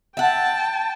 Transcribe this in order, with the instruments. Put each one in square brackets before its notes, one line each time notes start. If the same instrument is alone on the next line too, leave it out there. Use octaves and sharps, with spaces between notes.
[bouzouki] E5 F#5 [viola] G5 A5